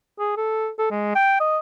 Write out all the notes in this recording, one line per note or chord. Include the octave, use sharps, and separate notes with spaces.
G#4
A4
A4
G#3
G5
D#5